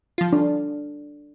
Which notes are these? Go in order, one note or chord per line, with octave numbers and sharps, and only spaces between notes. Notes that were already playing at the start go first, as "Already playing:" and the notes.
F3 F4
D4